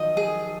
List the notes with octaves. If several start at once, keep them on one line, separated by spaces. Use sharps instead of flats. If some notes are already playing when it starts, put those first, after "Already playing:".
Already playing: D#3 F3 F#3 D#5
G#4